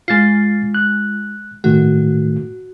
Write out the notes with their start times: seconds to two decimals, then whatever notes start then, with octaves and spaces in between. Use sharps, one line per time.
0.08 G#3 F4 A6 C7
0.75 F#6
1.64 A2 D#3 A3 F#4